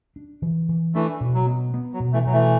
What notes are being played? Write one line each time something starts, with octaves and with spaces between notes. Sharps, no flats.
D4
E3
E3
E3 A3 D4
B2
F#3
B3
B3
F#3
B2
E3 A3
B2 F#3
E3 A3